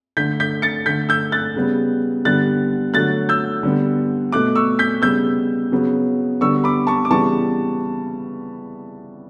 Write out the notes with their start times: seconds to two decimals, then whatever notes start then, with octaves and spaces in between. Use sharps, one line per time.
0.17 D3 A3 G6 B6
0.40 G6 B6
0.62 A6 C#7
0.86 D3 A3 G6 B6
1.09 E6 G6
1.32 F#6 A6
1.56 C#3 G3 B3
2.25 D3 G3 B3 F#6 A6
2.94 D3 F#3 A3 F#6 A6
3.29 E6 G6
3.63 D3 G3 B3
4.32 B2 A3 D6 F#6
4.56 C#6 E6
4.79 G6 B6
5.02 C#3 G3 B3 E6 G6
5.72 C#3 F#3 B3
6.41 D3 G3 B3 C#6 E6
6.64 B5 D6
6.87 A5 C#6
7.05 D6
7.10 C#3 E3 G3 B3 A5 C#6